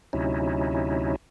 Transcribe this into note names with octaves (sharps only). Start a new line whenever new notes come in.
D2 C3 F#3 C#4 D#4 E4